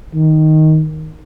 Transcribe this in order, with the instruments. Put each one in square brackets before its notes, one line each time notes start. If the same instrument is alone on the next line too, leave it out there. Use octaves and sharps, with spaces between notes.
[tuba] D#3